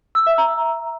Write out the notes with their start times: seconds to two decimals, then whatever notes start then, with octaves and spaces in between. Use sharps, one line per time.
0.15 E6
0.27 E5
0.38 A#5